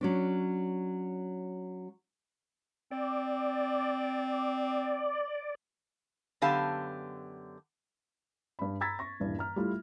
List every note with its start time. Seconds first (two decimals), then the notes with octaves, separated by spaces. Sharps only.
0.01 F#3 C#4 D4
2.91 C4 D5
6.42 F#2 D3 B3 G4 F5 A5
8.59 G2 B5
8.81 A#5 B5 E6 G#6 A6 B6
8.99 C#6 A#6
9.20 D#1 G2 E3
9.39 A#5 F6
9.56 G3 A3 E4 F4